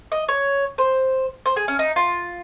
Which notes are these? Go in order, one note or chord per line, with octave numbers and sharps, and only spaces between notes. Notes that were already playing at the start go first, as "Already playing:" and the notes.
D#5
C#5
C5
C5
G#4
C#4
D#4
F4